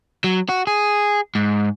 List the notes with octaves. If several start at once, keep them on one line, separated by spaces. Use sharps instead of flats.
F#3
F#4
G#4
G#2